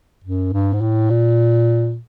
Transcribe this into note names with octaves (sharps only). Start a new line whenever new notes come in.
F#2
G2
G#2
A2
A#2